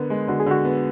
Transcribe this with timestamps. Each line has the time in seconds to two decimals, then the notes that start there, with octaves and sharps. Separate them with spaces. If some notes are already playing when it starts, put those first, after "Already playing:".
Already playing: D3 B3 A#4
0.10 G#3
0.28 D3 F#4
0.40 G#4
0.46 D3 F#4
0.64 B3